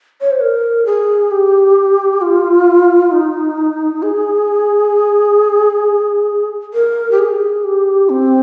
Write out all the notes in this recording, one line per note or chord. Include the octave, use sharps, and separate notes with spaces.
C#5
C5
A#4
G#4
G4
F4
D#4
G#4
A#4
G4
G#4
G4
C4